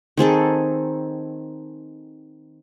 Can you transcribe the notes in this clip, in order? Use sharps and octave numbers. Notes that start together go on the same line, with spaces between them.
D#3 C4 G#4 A4